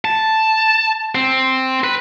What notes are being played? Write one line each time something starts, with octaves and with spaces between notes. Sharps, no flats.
A5
C4
B4